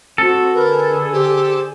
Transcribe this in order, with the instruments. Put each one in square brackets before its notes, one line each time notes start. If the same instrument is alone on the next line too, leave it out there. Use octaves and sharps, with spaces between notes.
[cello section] C4 F#4 [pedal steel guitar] A4
[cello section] D3 G#4 [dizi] A#4 [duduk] B4
[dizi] G4 [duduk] C5